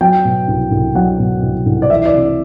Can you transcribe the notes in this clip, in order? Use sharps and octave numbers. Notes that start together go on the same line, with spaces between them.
F#3 G5
B2
C2
C2
F#3 F#5
B2
C2
C2
D5
E3 E5
D5
C3